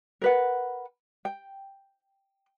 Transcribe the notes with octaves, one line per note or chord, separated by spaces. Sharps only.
A#4 B4 F#5
G5